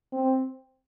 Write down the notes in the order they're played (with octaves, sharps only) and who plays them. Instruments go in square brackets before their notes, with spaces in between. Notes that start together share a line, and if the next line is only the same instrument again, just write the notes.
[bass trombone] C4